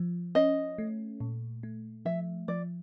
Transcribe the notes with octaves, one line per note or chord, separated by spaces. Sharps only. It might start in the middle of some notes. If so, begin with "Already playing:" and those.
Already playing: F3
C#4 D#5
A3
A#2
A3
F3 E5
F3 D5